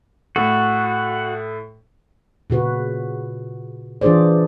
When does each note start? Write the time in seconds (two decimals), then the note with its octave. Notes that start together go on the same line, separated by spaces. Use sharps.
0.36 A2 F#4 A4
2.50 A#2 C#3 F#4 B4
4.01 E3 D4 F4 G#4 C5 D5